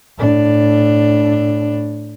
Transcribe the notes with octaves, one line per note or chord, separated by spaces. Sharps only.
A2 D4